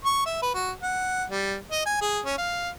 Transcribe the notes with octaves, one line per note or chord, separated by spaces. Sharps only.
C#6
E5
B4
F#4
F#5
G3
D#5
G#5
G#4
C#4
F5